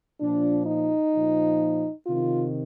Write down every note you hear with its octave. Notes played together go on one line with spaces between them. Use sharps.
A#2 F3 D4
D#4
A#2 F3
C3 D#3 F4